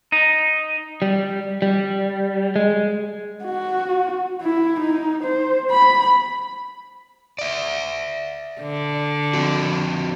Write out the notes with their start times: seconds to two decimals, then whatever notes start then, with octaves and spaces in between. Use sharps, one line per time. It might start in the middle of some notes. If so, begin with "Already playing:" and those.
0.12 D#4
1.02 G3
1.62 G3
2.56 G#3
3.45 F#4
4.42 E4
4.80 D#4
5.24 C5
5.71 B5
7.39 D5 E5
8.61 D3
9.33 F3 C4 F#4